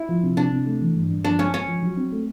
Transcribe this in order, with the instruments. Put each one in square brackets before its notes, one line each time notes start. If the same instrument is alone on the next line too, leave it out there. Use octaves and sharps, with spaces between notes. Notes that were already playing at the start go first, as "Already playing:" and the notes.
Already playing: [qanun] E4
[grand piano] F3
C3
[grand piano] C3 [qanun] D4
[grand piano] C3
A3
E3
G2
G2
[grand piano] F3 [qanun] D4
[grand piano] G#3 [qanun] C#4
[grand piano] G#3 [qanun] C#4
[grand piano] F3
F#3
C4
A3